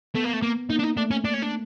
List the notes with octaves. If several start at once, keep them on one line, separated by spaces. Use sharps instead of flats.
A3 B3
A#3
A3
A#3
A#3 D#4
D4
D#4
A3 D4
C#4
D4
C#4
D4